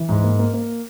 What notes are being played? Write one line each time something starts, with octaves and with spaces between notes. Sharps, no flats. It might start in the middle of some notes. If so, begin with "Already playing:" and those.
Already playing: E3
G#2
A#3
A#3
A#3